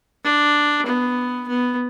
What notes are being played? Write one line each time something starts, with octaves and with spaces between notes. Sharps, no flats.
D4
B3
B3